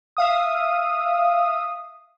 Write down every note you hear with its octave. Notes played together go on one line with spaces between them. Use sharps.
E5 F5 D#6